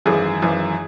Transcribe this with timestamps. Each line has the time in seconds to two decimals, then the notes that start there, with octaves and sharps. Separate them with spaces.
0.06 G#1 F#2 E3 G#4
0.42 G#1 F#2 E3